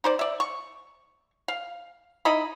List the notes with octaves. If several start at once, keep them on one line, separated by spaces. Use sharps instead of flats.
D#4 C5 D5
D5 E5
C#6
F5
D#4 E4 D#5 B5